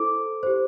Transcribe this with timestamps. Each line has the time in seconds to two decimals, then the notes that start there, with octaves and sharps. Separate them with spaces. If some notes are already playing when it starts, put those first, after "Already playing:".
Already playing: E4 A4 C5 D6
0.43 G4 C5